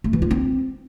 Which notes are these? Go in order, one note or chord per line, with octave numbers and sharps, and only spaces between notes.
A3
E3
F4
C4